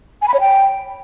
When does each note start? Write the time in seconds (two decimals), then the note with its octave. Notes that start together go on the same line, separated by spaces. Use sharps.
0.22 G#5
0.28 B5
0.34 C#5
0.40 G5